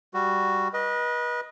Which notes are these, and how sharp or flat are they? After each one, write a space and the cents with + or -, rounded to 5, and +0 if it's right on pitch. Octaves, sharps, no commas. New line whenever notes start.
G3 +0 F#4 +0
B4 -30 D#5 +5